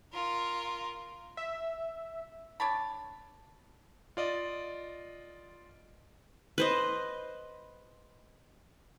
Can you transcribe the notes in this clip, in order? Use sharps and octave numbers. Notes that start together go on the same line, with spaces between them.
F4 A#4
E5
D4 C#5 A5 B5
F4 D5 D#5
B4 C5 D#5